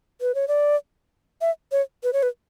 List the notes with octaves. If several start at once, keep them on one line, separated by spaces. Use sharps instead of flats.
B4
C#5
D5
E5
C#5
B4
C#5
B4